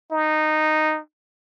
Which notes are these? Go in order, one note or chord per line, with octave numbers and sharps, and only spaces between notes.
D#4